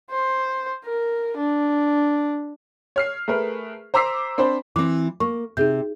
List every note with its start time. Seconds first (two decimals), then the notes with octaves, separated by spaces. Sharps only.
0.10 C5
0.84 A#4
1.37 D4
2.96 C#5 F6 C7
3.28 A3 G#4 A#4 B4
3.94 C5 A#5 D6 E6 B6 C7
4.38 C4 D4 C5 B5
4.76 E3 C4 D6
5.20 A#3 C#6
5.57 C3 D#4 G#4 G6